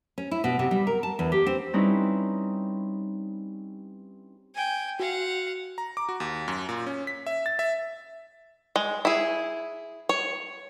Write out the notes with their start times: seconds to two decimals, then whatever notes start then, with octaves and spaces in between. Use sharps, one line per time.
0.18 C#4
0.31 E4
0.44 B2
0.59 C3
0.71 G3
0.87 A#4
1.03 A5
1.19 E2
1.32 G4
1.46 C4
1.73 G3 C4 C#4 D#4 E4 B4
4.56 G5 G#5
5.00 F#4 F5 F#5
5.78 A#5
5.97 D6
6.09 F#4
6.20 D#2
6.48 F#2
6.69 A#2
6.87 C#4
7.07 B6
7.27 E5
7.46 A6
7.59 E5
8.76 G#3
9.05 E4 G#4
10.09 C#5